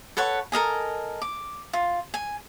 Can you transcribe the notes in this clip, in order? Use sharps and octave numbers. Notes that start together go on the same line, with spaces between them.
A4 B4 C#5 F#5
A4 A#4 D#5 G#5
D6
F4
G#5